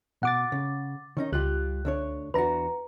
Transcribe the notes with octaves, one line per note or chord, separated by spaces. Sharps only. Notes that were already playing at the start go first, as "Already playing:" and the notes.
B2 F#5 D6 A6
C#3
D#3 C#4 D#4
C#2 G3 F4 G4 F#6
D2 D4 C#5
E2 D4 F#4 B4 A#5